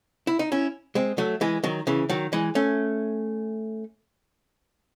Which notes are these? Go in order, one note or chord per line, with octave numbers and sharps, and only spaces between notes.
E4
D#4
C#4 E4
G#3 C4
F#3 A3
E3 G#3
D#3 F#3
C#3 E3
D#3 F#3
E3 G#3
A3 C#4